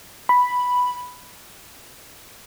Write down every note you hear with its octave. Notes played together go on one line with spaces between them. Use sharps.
B5